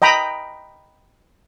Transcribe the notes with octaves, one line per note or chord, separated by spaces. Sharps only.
D#5 G5 A#5 B5 D#6